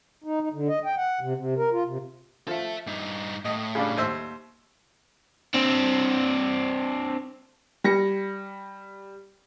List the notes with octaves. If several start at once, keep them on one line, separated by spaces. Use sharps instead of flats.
D#4
D#4
D3
D#5
G5
F#5
C3
C3
A#4
F4
C3
F3 A4 E5
G2 D#4
A2 D#5
C#3 G3 D4
D#2 C5 E5
C4 D4
G3 A#6 C#7